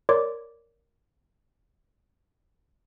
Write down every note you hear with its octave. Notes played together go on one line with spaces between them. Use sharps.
A#4 C#5 D5 C6 D6 G#6